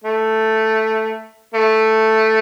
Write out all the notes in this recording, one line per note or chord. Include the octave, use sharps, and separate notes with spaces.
A3
A3